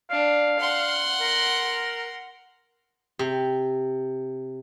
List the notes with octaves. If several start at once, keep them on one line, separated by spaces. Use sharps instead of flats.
D4 F5
F#5 C6
A#4
C3